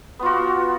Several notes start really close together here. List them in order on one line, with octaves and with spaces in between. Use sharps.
B3 F4 F#4